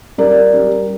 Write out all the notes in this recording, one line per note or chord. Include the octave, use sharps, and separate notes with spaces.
G3 A#4 D5
G3